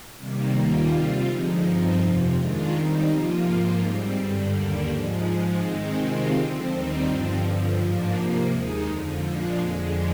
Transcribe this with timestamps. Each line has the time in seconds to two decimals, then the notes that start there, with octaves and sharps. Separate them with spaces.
0.17 C3 D#3 G3 A#3
0.54 D#2 D#3 G3 A#3 F4
0.90 C3 G3 C4 F4
1.26 D3 F3 G#3 D#4
1.62 G2 F3 C4 D#4
1.98 F2 C3 F3
2.34 D#3 G#3 D4 F4
2.70 D#3 G3 C4 D#4
3.07 C3 F3 A#3 F4
3.43 G#2 F3 A#3 F4
3.79 G#2 G3 C4
4.15 G2 D3 G3
4.52 D#2 D3 G3 A#3 D4
4.87 G#2 F3 G#3
5.24 G#2 F3 G#3
5.60 D#3 G#3 C4 D#4
5.96 C3 D#3 G#3 C4 F4
6.32 D3 F3 C4
6.68 D#2 D#3 G3 C4 D#4
7.04 G2 D3 F3 C4
7.41 G2 D3 F3
7.77 G#2 F3 A#3 D4
8.13 C3 F3 A#3
8.49 D#2 D#3 G#3 D#4
8.85 F2 D3 F3
9.22 A#2 F3 G#3 D4
9.58 F2 D3 G#3